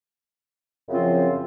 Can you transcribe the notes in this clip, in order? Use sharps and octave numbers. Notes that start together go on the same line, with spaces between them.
F#2 C#3 F3 C4 F4